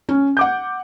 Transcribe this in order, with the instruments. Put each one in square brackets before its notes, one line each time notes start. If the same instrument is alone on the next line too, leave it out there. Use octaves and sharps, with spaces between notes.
[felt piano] C#4
F#5 D6 G6